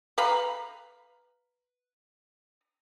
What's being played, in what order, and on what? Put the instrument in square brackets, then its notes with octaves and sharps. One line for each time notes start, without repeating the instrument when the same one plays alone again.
[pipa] B4 F5 A#5 B5